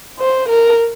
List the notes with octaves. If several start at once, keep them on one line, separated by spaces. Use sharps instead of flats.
C5
A#4